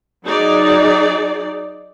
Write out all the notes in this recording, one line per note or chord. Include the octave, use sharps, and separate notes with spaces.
F#3 D#4 G#4 D5